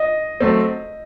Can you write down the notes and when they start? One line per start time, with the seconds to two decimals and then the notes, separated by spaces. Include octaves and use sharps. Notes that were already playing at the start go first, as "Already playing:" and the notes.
Already playing: D#5
0.40 F#3 A3 C4